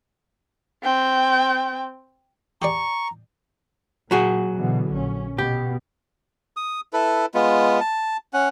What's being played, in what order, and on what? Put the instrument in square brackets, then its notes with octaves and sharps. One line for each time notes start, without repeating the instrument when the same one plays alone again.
[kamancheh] C4 G5
[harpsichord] G4 G#4 D5 [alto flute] A#5 [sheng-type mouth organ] C#6
[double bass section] A#2 [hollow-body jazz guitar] F#3 F#4 G#4
[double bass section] B2 D3 E3
A#1 C#4
[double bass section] B2 [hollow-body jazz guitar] G4
[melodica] D#6
E4 A4 B4
G#3 B3 F4
A5
C#4 F#5